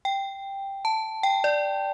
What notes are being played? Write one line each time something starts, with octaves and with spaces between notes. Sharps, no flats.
G5
A5
G5
D5